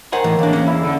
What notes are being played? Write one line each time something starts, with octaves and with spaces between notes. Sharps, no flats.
D#3 C5 F#5 G#5
A2 E3
C#3 E3 A#3 D4
E2 C#4
E4
D3